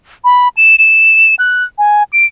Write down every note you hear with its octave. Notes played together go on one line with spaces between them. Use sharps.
B5
E7
E7
F#6
G#5
D7